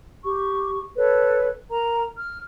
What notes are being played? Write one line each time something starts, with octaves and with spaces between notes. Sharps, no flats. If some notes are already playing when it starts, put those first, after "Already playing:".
G4 C#6
A4 B4 C#5
A#4 A#5
F6